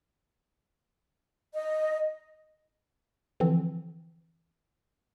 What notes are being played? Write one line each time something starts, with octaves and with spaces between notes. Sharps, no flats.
D#5
D3 E3 F3 C4